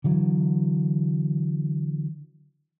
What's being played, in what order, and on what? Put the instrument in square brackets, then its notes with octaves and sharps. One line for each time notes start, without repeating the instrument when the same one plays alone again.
[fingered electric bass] D3 E3 F#3